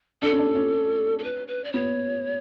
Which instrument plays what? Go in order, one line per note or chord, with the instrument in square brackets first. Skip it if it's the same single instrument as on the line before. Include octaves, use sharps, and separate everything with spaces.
[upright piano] D4 [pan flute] A4
[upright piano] C#4
D4
C#4
[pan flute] A4
B4
B4
D5
[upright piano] B3 [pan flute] C#5